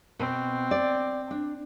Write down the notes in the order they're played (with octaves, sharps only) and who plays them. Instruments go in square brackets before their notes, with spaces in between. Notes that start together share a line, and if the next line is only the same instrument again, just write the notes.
[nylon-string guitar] B2 [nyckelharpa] C4
[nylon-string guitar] D5
D4